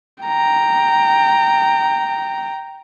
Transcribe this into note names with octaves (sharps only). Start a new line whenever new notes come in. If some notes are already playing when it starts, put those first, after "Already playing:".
G5 A#5